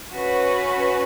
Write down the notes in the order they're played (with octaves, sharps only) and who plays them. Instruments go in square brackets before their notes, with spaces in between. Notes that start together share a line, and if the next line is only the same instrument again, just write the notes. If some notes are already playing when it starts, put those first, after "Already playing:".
[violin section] C#4 F#4 B4